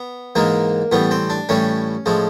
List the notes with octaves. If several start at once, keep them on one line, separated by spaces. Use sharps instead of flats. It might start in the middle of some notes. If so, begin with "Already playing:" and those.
Already playing: B3
G#2 E3 G#3 A#3
A2 E3 G3 B3
C4
D4
A2 E3 G3 C#4
A2 F3 G#3